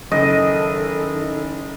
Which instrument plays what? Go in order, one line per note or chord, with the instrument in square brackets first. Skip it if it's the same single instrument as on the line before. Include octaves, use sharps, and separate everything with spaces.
[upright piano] F#1 [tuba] D#3 [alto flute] A4 [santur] D#5